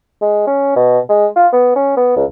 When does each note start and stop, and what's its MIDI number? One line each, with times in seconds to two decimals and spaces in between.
0.22 0.43 56
0.47 0.73 61
0.76 0.99 47
1.09 1.26 56
1.36 1.47 65
1.53 1.71 59
1.76 1.92 61
1.97 2.15 59
2.16 2.25 37